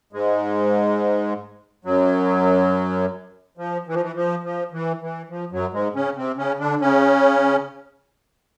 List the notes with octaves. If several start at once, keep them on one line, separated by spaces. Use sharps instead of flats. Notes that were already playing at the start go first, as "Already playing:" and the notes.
G#2 G#3
F#2 F#3
F3
E3
F3
E3
F3
F3
E3
E3
F3
F#2 F#3
G#2 G#3
C#3 C#4
C3 C4
C#3 C#4
D3 D4
C#3 C#4